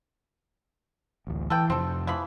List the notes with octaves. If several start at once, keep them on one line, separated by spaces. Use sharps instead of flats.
A1 D2
E3 A4 B4 G5
F2 C3 C4 A4
E3 F3 B5